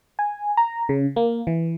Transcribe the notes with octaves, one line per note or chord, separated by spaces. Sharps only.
G#5
A#5
C#3
A#3
E3